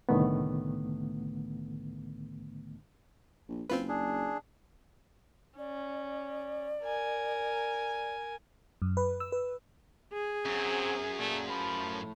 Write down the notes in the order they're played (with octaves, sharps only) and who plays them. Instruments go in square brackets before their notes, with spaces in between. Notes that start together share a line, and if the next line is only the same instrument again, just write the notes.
[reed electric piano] C2 A2 D3 D#3 A3 B3
[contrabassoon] A#1
[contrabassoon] F#1 [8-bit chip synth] C4 F4 B4
[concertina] D4 G#4
[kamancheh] C#4 [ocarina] D5
[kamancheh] A#4 G#5
[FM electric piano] F#2
B4
E6
B4
[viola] G#4
[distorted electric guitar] F#2 [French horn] F#3 [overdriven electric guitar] C4
[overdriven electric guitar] A#2 [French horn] A3
[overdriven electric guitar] A2 B5 [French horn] F3